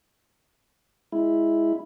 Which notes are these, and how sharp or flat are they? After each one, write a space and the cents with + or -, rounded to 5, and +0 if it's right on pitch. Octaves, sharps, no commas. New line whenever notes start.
G#3 +0 E4 +0